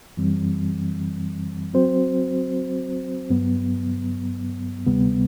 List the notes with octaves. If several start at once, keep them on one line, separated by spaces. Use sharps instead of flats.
F#2 E3 G3 C4
F#3 C4 F#4 C5
G2 F#3 B3
D2 C3 G3 B3